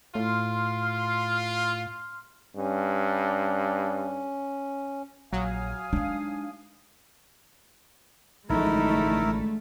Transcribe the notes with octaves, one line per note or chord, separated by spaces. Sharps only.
A2 F4 C6 F6
G2 C#4
A#1 F#3 F5 G#5 D#6
G#3 D4 D#4
A1 D3 F3 G#3 A3 D#4 E4 A#4